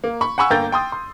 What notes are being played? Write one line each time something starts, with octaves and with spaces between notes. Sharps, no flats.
A#3
B5 C#6
F#5 G#5 B5 C#6 E6
G1 A#3 G5 A#5 G6 A6
G5 C6 D#6
C6